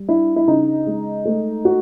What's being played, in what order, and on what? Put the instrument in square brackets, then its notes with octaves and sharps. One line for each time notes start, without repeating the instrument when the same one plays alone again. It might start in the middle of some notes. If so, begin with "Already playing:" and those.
Already playing: [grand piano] G3
[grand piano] D4 [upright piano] E4
[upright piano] E4
[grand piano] C#3 [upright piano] D#4
[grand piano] G#3
A3
F#4